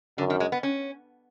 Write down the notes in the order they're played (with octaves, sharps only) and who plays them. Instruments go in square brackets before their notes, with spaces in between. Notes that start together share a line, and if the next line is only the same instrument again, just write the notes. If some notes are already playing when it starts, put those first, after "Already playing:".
[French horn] F#2 [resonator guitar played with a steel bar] D3
[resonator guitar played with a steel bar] D#3
G#3
B3
C#4